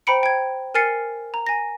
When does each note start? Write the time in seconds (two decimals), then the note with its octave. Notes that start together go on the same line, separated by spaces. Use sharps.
0.07 C5 G5 A#5 B5 C#7 D7
0.23 G5 G#6
0.75 A#4 G#5 F6 A6 C7 C#7
1.34 A#5
1.47 G#5 A#6